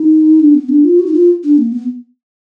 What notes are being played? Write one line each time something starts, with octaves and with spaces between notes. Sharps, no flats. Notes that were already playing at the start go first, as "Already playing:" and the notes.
Already playing: D#4
D4
B3
D4
F4
F#4
D#4
F4
D4
A#3
B3